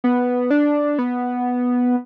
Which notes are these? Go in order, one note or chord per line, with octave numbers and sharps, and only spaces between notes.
B3
D4
B3